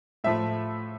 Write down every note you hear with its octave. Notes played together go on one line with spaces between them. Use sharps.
A2 F3 A3 E5